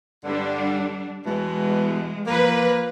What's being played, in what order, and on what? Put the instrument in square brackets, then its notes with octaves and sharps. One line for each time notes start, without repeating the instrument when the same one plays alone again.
[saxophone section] G2 D3 [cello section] G3 D4
[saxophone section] E2 B2 E3 [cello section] G#3
[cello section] F3 B4 [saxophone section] A#3